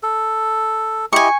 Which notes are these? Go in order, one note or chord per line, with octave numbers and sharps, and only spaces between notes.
A4
E4 G4 D#5 G#5 C#6